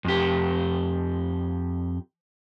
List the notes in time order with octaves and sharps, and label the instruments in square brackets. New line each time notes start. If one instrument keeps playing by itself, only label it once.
[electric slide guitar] F2 G4